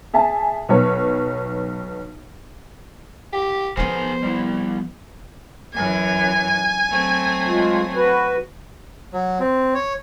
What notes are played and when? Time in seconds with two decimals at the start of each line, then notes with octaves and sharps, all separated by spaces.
0.13 G#4 E5 G#5 A5
0.69 B1 F#3 B4 C#5 C#6
3.33 G4
3.77 F3 B3 G#4 A#4 C5 G#5
4.23 G3 E4
5.73 F#2 E3 G#5
6.89 F#3 A3 C4
7.47 G#3 F4
7.95 F#4 B4
9.13 F#3
9.40 C4
9.74 C#5